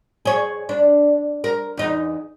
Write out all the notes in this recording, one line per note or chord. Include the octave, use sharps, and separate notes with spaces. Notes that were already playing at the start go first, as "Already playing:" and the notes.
G#4 C#5
D4
A#4
E2 D#4